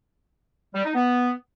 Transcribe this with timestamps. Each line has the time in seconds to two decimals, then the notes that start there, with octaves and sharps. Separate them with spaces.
0.74 G3
0.85 D#4
0.95 B3